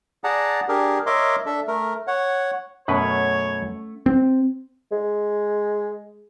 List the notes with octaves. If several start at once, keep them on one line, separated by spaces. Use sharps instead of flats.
G#4 D5 F#5 A5 A#5
D4 G4 G#4 A#4
A#4 C#5 D#5 E5 C6 D6
D4 A4 E5
A3 A#4
C#5 F#5
F#2 B2 A3 C#4 B4 C#5 F#5
C4
G#3